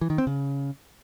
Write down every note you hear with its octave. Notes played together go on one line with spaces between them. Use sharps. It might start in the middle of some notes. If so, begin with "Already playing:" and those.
E3
D#3
C4
C#3